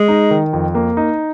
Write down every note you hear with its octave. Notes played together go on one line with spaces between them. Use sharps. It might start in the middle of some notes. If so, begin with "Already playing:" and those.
Already playing: G#3
D#4
D#3
F2
A#3
D#4